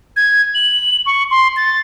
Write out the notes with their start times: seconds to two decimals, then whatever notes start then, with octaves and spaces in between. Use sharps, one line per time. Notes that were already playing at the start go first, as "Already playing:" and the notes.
0.16 G#6
0.54 F#7
1.06 C#6
1.31 C6
1.56 A6